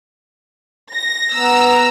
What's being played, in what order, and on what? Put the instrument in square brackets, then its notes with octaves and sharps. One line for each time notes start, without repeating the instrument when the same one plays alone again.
[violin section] A#6
[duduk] B3 [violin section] A#5 E6